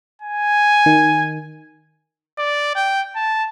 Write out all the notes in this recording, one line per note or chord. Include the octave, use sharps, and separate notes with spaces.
G#5
D#3
D5
G5
A5